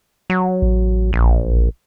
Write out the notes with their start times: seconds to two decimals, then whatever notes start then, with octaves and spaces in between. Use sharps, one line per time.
0.30 F#3
0.62 A1
1.13 A#1